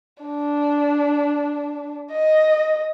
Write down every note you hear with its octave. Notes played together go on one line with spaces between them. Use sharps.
D4
D#5